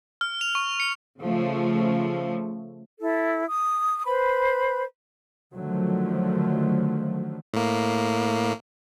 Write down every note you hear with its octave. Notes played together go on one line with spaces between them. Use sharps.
F6
F7
C#6
C#7
C#3 F3 A3
E4 A4
D#6
B4 C5 B5
D3 D#3 F3 F#3 A3
A2 A#3